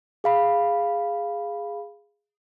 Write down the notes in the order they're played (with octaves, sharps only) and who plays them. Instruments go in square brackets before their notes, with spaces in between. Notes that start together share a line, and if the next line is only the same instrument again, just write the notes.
[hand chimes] G#4 F5 B5